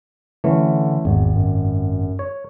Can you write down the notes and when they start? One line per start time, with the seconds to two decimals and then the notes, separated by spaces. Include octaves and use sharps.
0.44 D3 E3 A3 C#4
1.05 G#1 E2
1.35 F#2
2.19 C#5